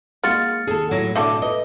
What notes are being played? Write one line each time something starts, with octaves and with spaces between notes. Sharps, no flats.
G#3 A#3 D#4 F4 F#4 F6 A6 C#7
D#2 G#4 A4
A2 F#3 E4 A#6
B2 D3 D4 F#4 A4 E5 D6
B4 D#5